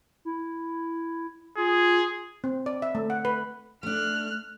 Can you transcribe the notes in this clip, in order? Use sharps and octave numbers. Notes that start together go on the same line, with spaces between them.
E4
F4 G#4
C4
D5
E5
A3
F#5
B4
A3 D4 F6 F#6